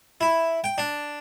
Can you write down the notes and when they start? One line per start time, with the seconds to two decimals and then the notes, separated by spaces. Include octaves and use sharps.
0.21 E4
0.64 G5
0.78 D4